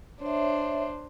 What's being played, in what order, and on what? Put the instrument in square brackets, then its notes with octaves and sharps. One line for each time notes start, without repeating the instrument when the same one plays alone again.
[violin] D4 C5 [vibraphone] C#5 E5